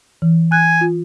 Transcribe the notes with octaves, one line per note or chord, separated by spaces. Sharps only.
E3
G#5 F#6
F4